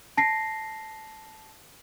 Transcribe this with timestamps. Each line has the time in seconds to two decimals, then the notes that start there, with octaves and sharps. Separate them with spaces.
0.17 A5 A#6 C7